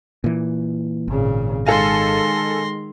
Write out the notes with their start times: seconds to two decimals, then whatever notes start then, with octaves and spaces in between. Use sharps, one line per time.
0.24 A#2 E3
1.08 G#1 A#2 C#3
1.66 D#3 G#3 A4 F5 G#5 C6 A#6